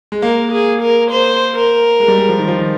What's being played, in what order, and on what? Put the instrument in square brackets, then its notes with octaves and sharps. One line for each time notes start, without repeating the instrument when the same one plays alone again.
[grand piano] G#3
[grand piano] A#3 [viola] A#4
[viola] G#4
A#4
C5
A#4
[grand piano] G#3
G3
G#3
F3
D#3
F3
D#3